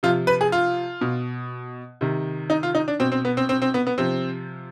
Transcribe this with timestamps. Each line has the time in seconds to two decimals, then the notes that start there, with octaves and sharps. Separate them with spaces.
0.03 C3 F3 F4
0.27 B4
0.41 G#4
0.52 F4
1.01 B2
2.01 C3 D#3
2.50 D#4
2.63 F4
2.75 D#4
2.88 D4
3.00 B2 C4
3.12 C4
3.25 B3
3.37 C4
3.49 C4
3.62 C4
3.74 B3
3.87 B3
3.98 C3 F3 C4